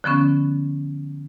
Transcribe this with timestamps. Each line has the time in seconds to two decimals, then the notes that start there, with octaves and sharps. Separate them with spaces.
0.04 D3 F3 B3 C#4